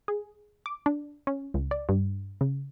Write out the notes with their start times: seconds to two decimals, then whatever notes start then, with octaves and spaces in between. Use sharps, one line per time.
0.08 G#4
0.66 D6
0.86 D4
1.27 C#4
1.54 C#2
1.71 D5
1.89 G2
2.41 C#3